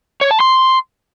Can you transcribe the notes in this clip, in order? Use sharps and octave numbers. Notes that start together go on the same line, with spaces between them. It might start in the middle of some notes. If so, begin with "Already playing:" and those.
C#5
A5
C6